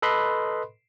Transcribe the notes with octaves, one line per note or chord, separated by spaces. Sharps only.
A4 B4 D#5 B5 C6